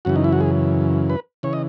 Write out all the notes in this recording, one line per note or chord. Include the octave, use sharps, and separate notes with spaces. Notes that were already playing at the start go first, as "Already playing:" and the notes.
F#2 C#3 E3 F#4
D#4
E4
F#4
G#4
B4
C#3 E3 C#5
D#5